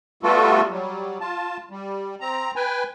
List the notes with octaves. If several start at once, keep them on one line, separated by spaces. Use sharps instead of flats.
G3 A3 B3 F4 F#4 A4
F#3 G3
F4 A5
G3
C4 A#5
B4 G5 G#5